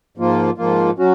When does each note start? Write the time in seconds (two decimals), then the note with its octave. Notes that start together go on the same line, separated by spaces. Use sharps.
0.17 G#2 F3 A#3 F4
0.58 G#2 F3 A#3 F4
0.98 F#3 C#4 F#4